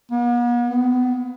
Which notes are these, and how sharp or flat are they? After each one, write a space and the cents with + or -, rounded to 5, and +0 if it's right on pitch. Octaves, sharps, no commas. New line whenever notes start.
B3 -45
B3 +30